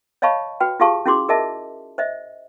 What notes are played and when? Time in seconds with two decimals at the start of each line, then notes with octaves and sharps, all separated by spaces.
0.22 C#5 D#5 F5 A5 B5 C#6
0.60 F#4 B4 G5
0.80 F4 G4 G#4 F5 A5 C#6
1.06 C#4 E4 F#4 G#4 C6 D6
1.29 G#4 A#4 D#5 E5 A5
1.98 C5 D#5 E5